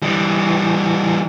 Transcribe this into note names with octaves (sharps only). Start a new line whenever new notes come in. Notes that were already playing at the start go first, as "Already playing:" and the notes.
E3 G3